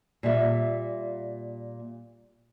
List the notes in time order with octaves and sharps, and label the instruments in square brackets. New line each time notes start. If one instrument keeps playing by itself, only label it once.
[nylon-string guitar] A#2 G3 E5